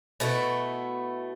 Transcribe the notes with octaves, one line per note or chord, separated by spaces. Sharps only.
B2 A3 B3 E4